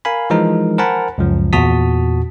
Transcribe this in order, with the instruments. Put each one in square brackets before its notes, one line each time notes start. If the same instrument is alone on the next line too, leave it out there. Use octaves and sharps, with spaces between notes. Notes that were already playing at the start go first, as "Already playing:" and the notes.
[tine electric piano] A#4 F5 G#5 B5
E3 F3 G#3 D#4 A#4
A#4 C5 F#5 G#5 A5 B5
C#2 F#2 F3
E2 A#2 F#4 A5 D#6 B6